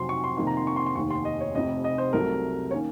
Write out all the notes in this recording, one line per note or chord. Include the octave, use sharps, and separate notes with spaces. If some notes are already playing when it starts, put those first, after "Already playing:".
Already playing: F2 C3 F#3 C6
C#6
C6
F2 C3 D#3 A#3 D#4 C6
A#5
C6
C#6
C6
C6
F1 D#2 D#3 C#6
C6
D#5
C#5
F1 F2 C3 D#5
D#5
C5
C2 C3 F#3 A3 A#4
D#3 A#3 C#4 C#5